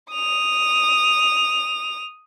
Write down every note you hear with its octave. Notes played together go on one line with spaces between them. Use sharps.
D#6 F7